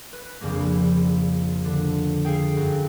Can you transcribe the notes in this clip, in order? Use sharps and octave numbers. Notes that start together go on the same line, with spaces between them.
B4
A#1 F2 C#3 G3 A#3
D3
G#4 A4 F5 G5
F#2